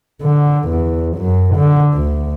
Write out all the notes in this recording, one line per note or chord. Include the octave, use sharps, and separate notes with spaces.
D3
E2
F#2
D3
D2